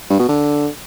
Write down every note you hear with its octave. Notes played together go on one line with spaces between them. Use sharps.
G2
B2
D3